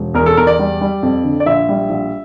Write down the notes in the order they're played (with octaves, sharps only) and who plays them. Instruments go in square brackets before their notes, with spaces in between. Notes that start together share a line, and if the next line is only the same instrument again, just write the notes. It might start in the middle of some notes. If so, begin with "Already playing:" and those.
Already playing: [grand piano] E1
E2 A#4
A4
E2 A#4
D5
G3
G3
F2
D3
D5
A#1 E5
G3
A#1